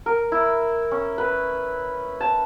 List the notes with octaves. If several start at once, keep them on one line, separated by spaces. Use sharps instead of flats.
A#4
E4
C#4
B4
A5